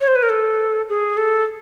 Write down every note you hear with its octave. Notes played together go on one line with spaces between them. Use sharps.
C#5
C5
B4
A#4
A4
G#4
A4